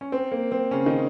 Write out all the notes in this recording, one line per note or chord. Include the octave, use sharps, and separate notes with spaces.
C#4
C4
A#3
C4
C#3 C#4
D#3 D#4